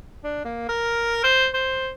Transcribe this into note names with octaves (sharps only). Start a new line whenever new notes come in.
D4
A#3
A#4
C5
C5